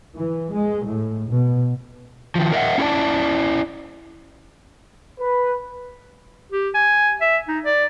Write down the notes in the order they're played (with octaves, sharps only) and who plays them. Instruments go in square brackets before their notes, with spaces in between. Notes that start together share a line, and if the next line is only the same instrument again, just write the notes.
[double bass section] E3
G#3
A2
B2
[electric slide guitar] D#3 F3
A#4 D#5 E5 F#5
C#4 E4 F#4 B4 D5 A5
[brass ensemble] B4
[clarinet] G4
G#5
E5
D#4
D5